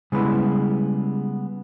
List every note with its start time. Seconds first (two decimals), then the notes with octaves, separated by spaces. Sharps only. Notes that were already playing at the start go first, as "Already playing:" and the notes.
0.12 C#3 G3 G#3 B3 E4 B4